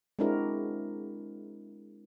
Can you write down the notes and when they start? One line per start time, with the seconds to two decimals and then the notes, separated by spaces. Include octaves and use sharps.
0.19 G#3 C4 D4 E4 F#4 A#4